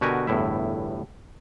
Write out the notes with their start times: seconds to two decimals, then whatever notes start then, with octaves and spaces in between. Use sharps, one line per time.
0.01 B2 D3 F#4 G4 A#4 G#5
0.27 G1 E2 A2 E4 E5